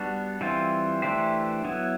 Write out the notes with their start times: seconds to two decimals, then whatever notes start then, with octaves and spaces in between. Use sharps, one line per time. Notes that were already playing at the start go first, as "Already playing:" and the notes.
Already playing: G3 B3 D4 F#4
0.41 E3 G3 C4 F4
1.02 E3 A3 D4 G4 C5
1.64 F#3 B3 E4